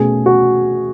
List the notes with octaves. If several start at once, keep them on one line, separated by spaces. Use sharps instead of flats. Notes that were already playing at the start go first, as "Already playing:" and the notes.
Already playing: B2 A3 C#4 G#4
F#4